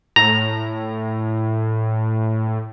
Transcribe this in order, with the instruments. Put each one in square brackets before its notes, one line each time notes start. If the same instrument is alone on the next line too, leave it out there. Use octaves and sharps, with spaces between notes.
[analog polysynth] A2 [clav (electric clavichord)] A#5